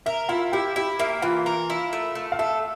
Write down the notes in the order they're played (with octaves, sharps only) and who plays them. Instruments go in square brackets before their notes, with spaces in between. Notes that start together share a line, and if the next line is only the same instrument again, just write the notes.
[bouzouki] A#4 [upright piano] E5
[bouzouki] E4 [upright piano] F4 F5
[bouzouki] E4 [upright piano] G4 G5
[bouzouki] E4 [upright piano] G4 G5
[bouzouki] A#3 [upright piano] E5
[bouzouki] E3 [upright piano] F4 F5
[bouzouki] A#4
E4
A3
A3
[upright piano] F5
[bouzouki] A4 [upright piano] E5